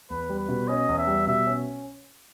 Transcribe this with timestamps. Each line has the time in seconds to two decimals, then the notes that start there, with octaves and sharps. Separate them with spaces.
0.10 E2 B4
0.29 G3
0.39 B4
0.49 B2
0.68 C#4 D#5
0.89 E2
0.98 E5
1.07 G3
1.27 B2 E5
1.47 C#4